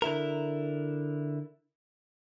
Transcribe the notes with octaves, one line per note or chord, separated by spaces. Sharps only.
D3 E4 A#4